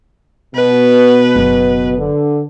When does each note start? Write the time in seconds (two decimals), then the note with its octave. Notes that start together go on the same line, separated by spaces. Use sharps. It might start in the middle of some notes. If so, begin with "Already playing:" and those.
0.55 B2 B4
1.36 F#1
1.98 D3